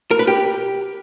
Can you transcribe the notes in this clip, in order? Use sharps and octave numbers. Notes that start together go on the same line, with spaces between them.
A#4
B4
G4